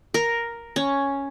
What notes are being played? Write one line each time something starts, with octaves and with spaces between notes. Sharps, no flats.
A#4
C#4